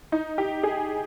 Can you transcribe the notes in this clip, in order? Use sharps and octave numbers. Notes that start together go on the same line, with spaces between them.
D#4
G4
G#4